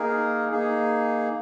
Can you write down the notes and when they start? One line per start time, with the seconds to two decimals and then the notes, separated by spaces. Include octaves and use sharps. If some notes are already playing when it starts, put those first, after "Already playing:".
Already playing: A#3 D#4 G#4 A#4
0.52 A#3 D#4 G#4